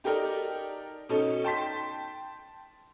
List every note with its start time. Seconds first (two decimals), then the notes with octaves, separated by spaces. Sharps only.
0.04 D#4 G4 A4 A#4 D5
1.09 B2 C#4 D#4 A4
1.44 G5 A5 C6 B6